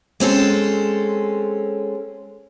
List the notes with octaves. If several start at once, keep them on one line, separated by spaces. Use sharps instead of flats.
G#3 C4 C#4 A4